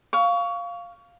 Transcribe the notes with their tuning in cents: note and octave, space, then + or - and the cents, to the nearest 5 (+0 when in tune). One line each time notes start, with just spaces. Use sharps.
F5 +0 C#6 +25